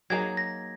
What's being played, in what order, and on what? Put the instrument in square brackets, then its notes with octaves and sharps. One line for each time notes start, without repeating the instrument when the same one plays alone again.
[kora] F#3 A#3 D#4 G#4 [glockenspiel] G#6
[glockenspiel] A#6